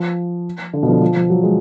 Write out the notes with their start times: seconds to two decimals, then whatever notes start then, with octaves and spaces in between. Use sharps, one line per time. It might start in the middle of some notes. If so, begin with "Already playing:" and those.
Already playing: F3
0.73 D3
0.83 B2
0.88 F3
0.92 D3
1.01 F3
1.16 F3
1.30 F#3
1.43 G#3